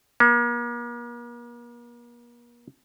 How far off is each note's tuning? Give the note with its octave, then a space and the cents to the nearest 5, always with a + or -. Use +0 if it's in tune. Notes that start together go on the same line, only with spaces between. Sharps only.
A#3 +40